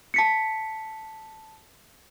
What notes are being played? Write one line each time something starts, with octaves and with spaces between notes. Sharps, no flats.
A5 B6 C#7